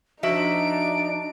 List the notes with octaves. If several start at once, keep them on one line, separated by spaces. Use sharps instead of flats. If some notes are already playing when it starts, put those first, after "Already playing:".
F3 D4 D#4 F#4 E5 D7